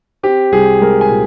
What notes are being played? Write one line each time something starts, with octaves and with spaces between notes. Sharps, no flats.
C4 G4
C2 G#4
G#3 A#4
G#5
A#2